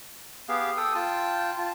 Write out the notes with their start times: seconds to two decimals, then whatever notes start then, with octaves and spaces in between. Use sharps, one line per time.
0.49 B3 G4 G#4 F5
0.77 A4 G5 D#6
0.95 F4 G5 A5
1.58 F4 A5